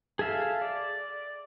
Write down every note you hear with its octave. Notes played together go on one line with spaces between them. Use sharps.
G#4 A4 E5 F5
D5